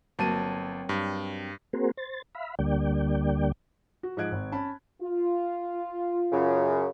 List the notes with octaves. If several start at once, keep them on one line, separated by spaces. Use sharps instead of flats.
G1 F#3 A#3 C4 A5 D#7
G2
A#3 C4 F#4 G#4 A#4 C5
C5 A6
E5 F5 B5
D2 D3 G3 A#3 D5 G5
F#4
G#2 F3 D#5 F#6 G#6 D7
G#1
C#4 A5 B5
F4
F#2 C#3